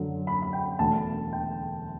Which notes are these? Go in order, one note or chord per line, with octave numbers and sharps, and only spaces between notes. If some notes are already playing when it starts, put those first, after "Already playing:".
Already playing: F#2 D3 F#3
B5
B5
G5
E1 D2 D3 A3 A5
G5